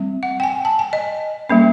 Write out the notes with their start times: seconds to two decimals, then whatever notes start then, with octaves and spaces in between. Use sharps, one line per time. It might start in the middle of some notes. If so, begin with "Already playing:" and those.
Already playing: G3 C4
0.23 F#5
0.40 G5
0.43 G#5
0.65 A5
0.79 G#5
0.93 D#5
1.49 G3 A#3 C#4